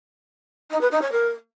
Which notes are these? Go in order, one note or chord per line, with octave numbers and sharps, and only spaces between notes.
D#4
B4
D#4
C#5
A#4